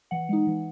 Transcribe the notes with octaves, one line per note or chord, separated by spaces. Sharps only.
E3 F#5
G#3 D#4
E3